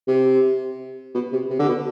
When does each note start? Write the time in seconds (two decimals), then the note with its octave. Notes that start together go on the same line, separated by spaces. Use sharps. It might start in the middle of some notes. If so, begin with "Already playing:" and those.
0.08 C3
1.15 B2
1.33 C3
1.50 C3
1.59 D3
1.69 B2